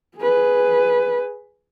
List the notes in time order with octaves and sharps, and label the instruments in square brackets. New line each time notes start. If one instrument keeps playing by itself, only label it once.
[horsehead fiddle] G#4 B4